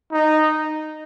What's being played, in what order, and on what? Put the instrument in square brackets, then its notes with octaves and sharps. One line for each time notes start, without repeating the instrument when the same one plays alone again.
[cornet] D#4